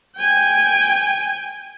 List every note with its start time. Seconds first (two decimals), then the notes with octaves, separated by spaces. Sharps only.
0.17 G5 G#5